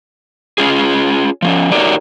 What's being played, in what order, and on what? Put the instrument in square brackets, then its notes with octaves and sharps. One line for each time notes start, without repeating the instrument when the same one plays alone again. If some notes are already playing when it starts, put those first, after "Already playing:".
[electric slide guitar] C#4 F4 G#4
F3 A#3 C#4
D#4 F#4 G4 A#4 C#5 D5